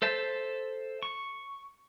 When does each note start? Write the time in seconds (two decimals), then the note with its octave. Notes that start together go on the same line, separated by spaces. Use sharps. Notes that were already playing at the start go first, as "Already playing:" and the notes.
0.02 A4 C5 E5 A5
1.03 C#6